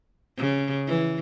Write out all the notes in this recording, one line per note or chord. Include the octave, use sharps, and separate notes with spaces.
C#3
E3